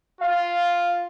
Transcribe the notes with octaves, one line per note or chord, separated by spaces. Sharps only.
F4 F5